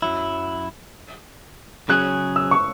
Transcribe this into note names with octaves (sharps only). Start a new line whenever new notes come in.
F#2 F#3 E4
C#3 F#3 C#4 G#4 F#6
E6
C#6